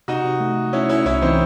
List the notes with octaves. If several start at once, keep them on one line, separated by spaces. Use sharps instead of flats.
C3 D#4 F#4
C3
A3
A3
A3 C#4 E4
A3 C#4 E4
C2 C#4 E4
E3 C4 D#4